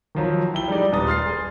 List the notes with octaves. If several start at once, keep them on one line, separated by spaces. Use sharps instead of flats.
D#3 F3 F#3
E4 G5 G7
G3 G#3 D#4 D5
D#1 B4 A#5 D#6 A6
C6 F6 A6 C7
G#4